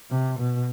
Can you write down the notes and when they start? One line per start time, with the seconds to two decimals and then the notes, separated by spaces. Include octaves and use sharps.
0.11 C3
0.39 B2